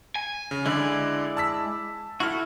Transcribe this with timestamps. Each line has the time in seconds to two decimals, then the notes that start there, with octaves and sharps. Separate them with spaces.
0.16 G#5
0.51 C#3
0.66 D3 G#3 E4 D5
1.37 A5 E6 B6
2.20 E4 F#4 A4 F6